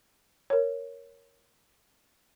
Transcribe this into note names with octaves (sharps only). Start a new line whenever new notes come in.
A#4 C#5